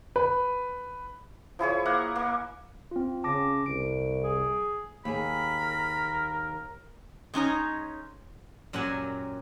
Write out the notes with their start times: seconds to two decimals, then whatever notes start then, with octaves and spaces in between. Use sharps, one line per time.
0.16 B4
1.59 F3 E4 G#4 C#5
1.85 A#3 A#4 E5 F#5
2.16 A#3
2.91 C4 F4
3.24 C#3 A5 D6 A#6
3.66 C2 D7
4.24 G#4
5.05 D#2 G#4 A#4 B5
7.34 G#3 C#4 D#4 C#5
8.73 F#2 A#2 F#3 G4 F#5 G#5